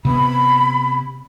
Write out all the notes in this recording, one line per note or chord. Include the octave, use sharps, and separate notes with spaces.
C3 B3 B5